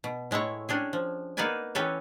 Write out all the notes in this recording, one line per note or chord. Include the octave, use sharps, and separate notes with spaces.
B2
A2 G#3 A3 E4 C#5
C#4 D4 G4 G#4
F3
A#3 B3 D#4 B4 D5 G#5
E3 C#4 G4 A4 B4 C#5